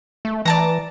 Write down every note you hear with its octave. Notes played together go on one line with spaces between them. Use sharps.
A3
E3 D5 A5 A#5